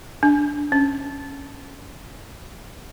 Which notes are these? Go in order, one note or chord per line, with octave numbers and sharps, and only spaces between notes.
D4
C#4